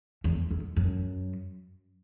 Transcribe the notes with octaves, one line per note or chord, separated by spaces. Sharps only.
E2
E2
F#2